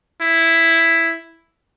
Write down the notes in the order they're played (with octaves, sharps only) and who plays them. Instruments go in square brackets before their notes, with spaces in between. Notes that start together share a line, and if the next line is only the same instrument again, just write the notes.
[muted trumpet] E4